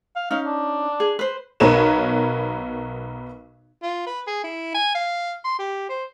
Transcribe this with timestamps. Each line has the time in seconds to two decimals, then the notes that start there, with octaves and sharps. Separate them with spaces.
0.16 F5
0.31 C#4 D#4 F5
0.46 D4
1.00 G#4
1.19 B4 C5
1.60 B1 B3 A#4 B4 C#5 E7
3.82 F4
4.06 B4
4.27 G#4
4.43 E4
4.75 G#5
4.95 F5
5.44 C6
5.59 G4
5.89 C5